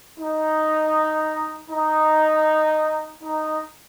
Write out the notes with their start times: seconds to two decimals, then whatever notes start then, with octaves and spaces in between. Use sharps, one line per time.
0.19 D#4
1.71 D#4
3.23 D#4